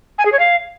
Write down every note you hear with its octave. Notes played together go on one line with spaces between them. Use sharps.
G#5
G#4
C#5
F5